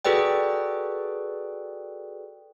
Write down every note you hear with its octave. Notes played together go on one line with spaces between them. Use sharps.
F#4 G#4 A4 B4 D5 G5